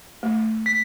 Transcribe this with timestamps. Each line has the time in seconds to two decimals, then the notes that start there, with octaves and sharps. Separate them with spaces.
0.23 A3
0.66 B6